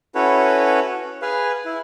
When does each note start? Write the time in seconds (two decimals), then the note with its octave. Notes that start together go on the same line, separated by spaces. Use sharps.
0.15 C#4 E4 F#4 A4 B4 C#5
1.22 G#4 B4 F5
1.65 E4